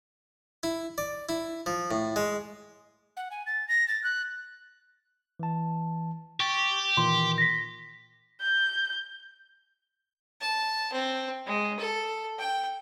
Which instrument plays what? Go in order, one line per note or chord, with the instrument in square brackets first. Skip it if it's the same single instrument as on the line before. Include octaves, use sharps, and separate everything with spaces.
[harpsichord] E4
D5
E4
F3
A2
G#3
[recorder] F#5
G#5
A6
A#6
A6
F#6
[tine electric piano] E3 A5
[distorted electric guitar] G4 [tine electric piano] C#6 A6
[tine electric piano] A#2 D#3 E3 [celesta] C6
[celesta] A#6 B6
[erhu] G6
[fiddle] A5
C4
G#3
A4
G5